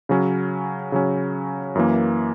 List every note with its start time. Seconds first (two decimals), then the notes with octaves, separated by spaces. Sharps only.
0.09 C#3 F#3 C#4
0.92 C#3 F#3 C#4
1.75 F#2 E3 A#3